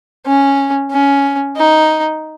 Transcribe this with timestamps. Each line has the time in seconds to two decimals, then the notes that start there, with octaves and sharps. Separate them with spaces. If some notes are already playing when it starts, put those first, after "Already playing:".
0.26 C#4
0.91 C#4
1.57 D#4